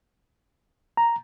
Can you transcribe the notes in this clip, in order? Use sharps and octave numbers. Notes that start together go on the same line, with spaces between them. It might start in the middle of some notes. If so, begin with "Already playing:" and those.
A#5